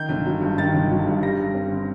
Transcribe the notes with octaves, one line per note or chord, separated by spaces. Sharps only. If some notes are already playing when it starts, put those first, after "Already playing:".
Already playing: D#3 G6
G1
F#3
G2
D#3 A6
G1
F#3
G2
G3 A#6
G2
C4
D3